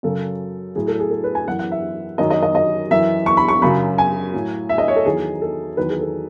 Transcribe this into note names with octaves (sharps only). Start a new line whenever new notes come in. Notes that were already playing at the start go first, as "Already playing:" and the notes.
F#2 C#3 F#3 A4
A2 F#3 G#4
A4
G#4
A4
B4
G#5
F#2 E3 F#5
F#5
E5
F#2 D#3 F#3 D#5
D#5
D#5
D#5
F#2 E3 E5
C#6
B5
C#6
F#2 C#3 F#3 B5
G#5
A2 F#3
E5
D#5
C#5
A4
E2 D#3 F#3 G#4
A4
E2 D#3 F#3 B4
G#4
A4